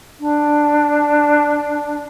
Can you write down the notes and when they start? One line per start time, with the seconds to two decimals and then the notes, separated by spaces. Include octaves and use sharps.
0.20 D4